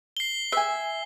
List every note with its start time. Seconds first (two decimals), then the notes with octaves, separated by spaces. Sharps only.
0.17 C7 G7
0.52 E5 G#5